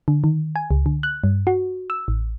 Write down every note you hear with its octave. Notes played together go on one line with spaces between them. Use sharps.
D3
D#3
G#5
C#2
D3
F#6
G2
F#4
E6
A1